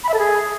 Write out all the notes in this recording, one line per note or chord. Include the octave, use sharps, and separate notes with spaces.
B5
E5
A4
G#4